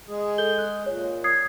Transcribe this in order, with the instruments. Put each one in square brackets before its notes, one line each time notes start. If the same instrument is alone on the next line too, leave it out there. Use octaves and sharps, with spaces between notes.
[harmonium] G#3 G#4
[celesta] A4 G6 G7
F#6
[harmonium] A#2 [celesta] C#5
[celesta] D#6 G#6 C7